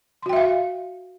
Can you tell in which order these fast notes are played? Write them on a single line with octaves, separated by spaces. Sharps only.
C6 F#4 G5 E5 F5